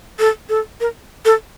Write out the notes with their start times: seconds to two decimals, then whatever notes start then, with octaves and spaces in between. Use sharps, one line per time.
0.20 A4
0.49 A4
0.81 A#4
1.25 A4